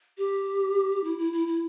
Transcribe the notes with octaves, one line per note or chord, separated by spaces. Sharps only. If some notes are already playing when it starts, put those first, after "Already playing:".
G4
E4
E4
E4
E4